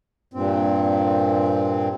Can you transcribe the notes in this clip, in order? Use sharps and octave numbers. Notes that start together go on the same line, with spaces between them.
G2 A#2 C4